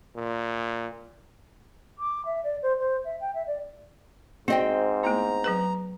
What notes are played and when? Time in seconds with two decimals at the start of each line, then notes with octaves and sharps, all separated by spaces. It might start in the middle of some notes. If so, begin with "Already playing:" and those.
0.16 A#2
1.98 D6
2.25 E5
2.43 D5
2.62 C5
2.79 C5
3.04 E5
3.20 G5
3.34 E5
3.47 D5
4.48 G#2 C4 F#4 D#5 G5
5.03 A3 B3 E4 A#5
5.44 F#3 G#4 B4